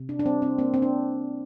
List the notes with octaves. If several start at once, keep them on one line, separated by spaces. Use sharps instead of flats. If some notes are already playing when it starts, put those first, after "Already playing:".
Already playing: C3
D4
D4
G3 C4
C4
A#3 C4
C4
D4